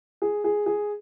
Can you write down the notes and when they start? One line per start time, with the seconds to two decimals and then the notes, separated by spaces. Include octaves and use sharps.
0.22 G#4
0.44 G#4
0.66 G#4